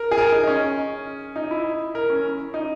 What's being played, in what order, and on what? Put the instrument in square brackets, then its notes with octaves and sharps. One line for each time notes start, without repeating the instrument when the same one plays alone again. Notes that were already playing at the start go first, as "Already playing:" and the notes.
Already playing: [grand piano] A#4
G#4
A#4
D#4
D#4
C#4
D#4
E4
A#4
C#4
D#4